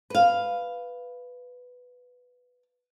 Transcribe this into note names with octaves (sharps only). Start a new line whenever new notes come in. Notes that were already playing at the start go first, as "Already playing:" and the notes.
B4 F5